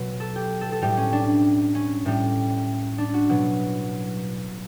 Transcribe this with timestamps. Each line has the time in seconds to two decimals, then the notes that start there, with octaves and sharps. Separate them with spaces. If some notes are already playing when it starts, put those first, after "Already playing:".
Already playing: B2 F#3 B4
0.20 A4
0.36 G4
0.61 A4
0.72 A4
0.82 A2 G3 G4
0.97 C#4
1.13 D4
1.75 C#4
2.05 A2 G3
2.98 D4
3.14 F#4
3.29 B2 F#3